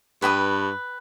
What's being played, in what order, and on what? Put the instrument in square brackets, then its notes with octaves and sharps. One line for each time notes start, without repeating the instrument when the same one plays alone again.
[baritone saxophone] G2 [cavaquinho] B4 G5 D#6